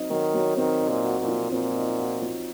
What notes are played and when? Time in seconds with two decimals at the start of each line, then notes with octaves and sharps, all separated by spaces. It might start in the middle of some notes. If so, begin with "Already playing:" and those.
Already playing: F#3 C4 D#4
0.10 D#3 F#3
0.34 F#3
0.57 D#3 C4
0.81 D#4
0.89 A#2
1.04 F#4
1.20 A#2
1.28 F3
1.51 A#2 C4
1.75 D#4
1.98 F#4
2.22 F3